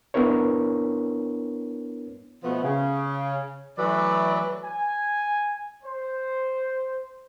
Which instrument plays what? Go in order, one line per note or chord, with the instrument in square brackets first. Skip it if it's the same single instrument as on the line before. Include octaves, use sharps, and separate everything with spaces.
[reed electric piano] B3 D4 E4 A#4 C#5
[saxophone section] B2 F3 A3 B3
C#3
E3 F#3 A3 B4 D5
[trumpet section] G#5
C5